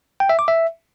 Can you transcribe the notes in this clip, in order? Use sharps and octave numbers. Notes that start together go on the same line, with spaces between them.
G5
E5
D6
E5